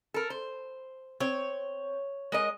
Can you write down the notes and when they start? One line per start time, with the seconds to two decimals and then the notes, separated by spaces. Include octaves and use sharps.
0.14 A4 A#4
0.30 C5
1.20 C4 C#5
2.32 G#3 A#4 D#5